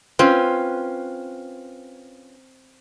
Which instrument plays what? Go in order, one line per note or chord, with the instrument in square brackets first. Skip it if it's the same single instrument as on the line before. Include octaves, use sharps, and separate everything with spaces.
[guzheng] C4 [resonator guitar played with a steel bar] C#4 F4 B4